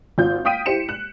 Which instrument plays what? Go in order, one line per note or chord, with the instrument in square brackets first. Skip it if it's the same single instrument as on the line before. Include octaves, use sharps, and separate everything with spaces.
[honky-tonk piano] G#1 F4 G6
F5 G5 D#6 B6 D7 D#7
E4 G4 C5 C#7 E7
F#6